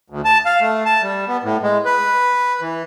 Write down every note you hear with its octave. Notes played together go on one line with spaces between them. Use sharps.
D2
A5
F5
A3
A5
G3
B3
A2
G#3
B4
E3